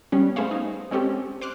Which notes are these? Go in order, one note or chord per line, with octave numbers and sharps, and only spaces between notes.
G3 B3 C#4
A3 B3 G#4 C5 C#5 F5
D#4
G#3 C4 C#4 G4 A4
C5 D6 F6 F#6